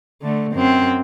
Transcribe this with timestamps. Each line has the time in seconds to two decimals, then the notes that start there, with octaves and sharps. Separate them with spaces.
0.22 D3 A3
0.52 F#2 C4